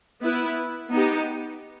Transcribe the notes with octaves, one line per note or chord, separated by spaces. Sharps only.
B3 E4 B4
B3 D#4 G4